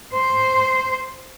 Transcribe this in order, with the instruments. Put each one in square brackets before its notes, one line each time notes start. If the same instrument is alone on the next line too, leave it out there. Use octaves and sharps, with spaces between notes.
[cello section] C5